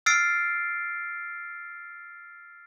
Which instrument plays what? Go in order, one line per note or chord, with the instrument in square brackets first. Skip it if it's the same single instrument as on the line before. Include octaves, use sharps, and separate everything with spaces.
[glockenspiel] E6 F6 A6 C7 D7